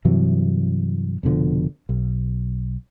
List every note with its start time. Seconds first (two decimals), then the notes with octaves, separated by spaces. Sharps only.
0.05 G2 C3 E3 F#3
1.23 F1 B2 D3 F3
1.89 B1